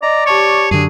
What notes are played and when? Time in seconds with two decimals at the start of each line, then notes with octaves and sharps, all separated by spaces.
0.03 D5 D#5 A#5
0.26 G4 C#5 A5 C#6
0.71 F#2 D3 G#4